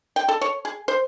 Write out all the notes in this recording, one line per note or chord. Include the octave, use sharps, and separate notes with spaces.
G5
A4
C#5
G#4
C5